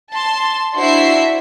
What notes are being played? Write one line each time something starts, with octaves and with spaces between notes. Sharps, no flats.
A5 C6
D4 E4 F#4 C5 E5 C7